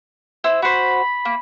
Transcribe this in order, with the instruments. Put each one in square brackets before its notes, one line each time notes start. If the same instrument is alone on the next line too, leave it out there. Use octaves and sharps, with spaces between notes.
[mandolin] E4 C5 E6
[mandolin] F#4 C5 [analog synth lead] B5
[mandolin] A#3